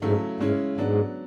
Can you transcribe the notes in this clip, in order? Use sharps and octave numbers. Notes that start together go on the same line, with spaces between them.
G#2 C#3 F#3 A3 E4
G#2 C#3 G#3 C#4 E4
G#2 F#3 B3 D4